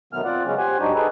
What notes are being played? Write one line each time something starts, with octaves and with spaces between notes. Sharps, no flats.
B2 D#3 F#3 A3 B3 F6
C4 F4 D5 F#5
C#3 F#3 G#3 B3 C#4
G4 C5 F#5 G#5
G#2 F#3 D4 D#4 F#4 G4
D#4 G#4 A4 B4